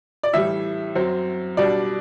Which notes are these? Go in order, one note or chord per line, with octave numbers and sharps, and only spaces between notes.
D5
A2 E3 G3 E5
F#2 F#3 C4
B2 G3 D4 D5